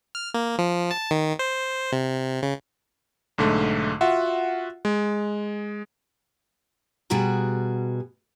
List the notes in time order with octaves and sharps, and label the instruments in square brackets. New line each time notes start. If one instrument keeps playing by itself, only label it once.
[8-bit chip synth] F6
A#3
F3
A5
D#3
C5
C3
C#3
[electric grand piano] B1 G#2 D3 A3
F4 F#4 E5 F#5
G#3
[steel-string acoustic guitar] B2 G3 F#4 G#4 A#5